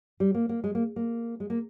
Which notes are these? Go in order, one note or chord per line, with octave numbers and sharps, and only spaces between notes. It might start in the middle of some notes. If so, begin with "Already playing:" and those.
G3
A#3
A#3
G#3
A#3
A#3
G#3
A#3